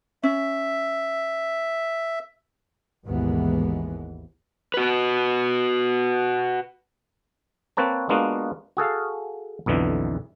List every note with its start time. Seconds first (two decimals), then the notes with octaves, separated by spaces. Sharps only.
0.23 C#4 E5
3.06 G#1 D#2 B2 E3 G#3 B3
4.74 F#4 B4
7.77 A#3 C4 B4 C#5 A5
8.09 G#3 A#3 B3 D4 F4 F#4
8.77 F#4 G#4 A4 F5
9.66 B1 F2 B2 D3 E3